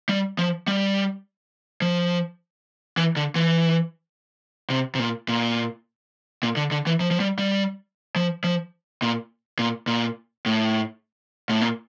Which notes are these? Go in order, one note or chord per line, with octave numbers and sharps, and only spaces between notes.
G3
F3
G3
F3
E3
D3
E3
C3
C3
A#2
A#2
A#2
D3
D3
E3
F3
F3
G3
G3
F3
F3
A#2
A#2
A#2
A2
A2
A#2